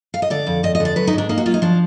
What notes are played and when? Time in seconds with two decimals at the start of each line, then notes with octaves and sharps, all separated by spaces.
0.14 F5
0.22 D#5
0.30 D3 D5
0.47 F2
0.63 F2 D#5
0.75 D#5
0.80 D3
0.85 D5
0.96 F#3 B4
1.07 D#4
1.13 G#2
1.18 D4
1.29 A#3 D#4
1.38 F#4
1.46 F#3 F4
1.54 D#4
1.62 F3 D4